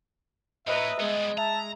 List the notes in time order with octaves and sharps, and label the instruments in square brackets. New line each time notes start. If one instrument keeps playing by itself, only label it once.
[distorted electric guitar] A2 [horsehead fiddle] B4 A#5 [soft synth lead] D#5 [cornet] E5
[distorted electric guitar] G3 B3 [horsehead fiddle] G#3
[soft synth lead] E5 [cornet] A5 [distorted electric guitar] A#5